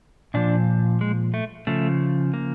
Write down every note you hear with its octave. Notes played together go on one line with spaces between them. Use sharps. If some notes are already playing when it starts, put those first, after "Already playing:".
A#2 F3 D4
G#3
A3
C#3 F3 A3
A#3